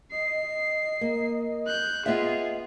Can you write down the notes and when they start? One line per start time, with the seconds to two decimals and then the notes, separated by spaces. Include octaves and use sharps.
0.12 D#5 C7
1.01 A#3
1.66 F#6 G6
2.06 B3 F4 G#4 D#5 E5